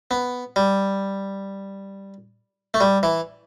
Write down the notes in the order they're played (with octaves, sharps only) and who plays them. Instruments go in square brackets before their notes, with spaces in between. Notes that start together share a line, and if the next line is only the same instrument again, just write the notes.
[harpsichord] B3
G3
A3
G3
E3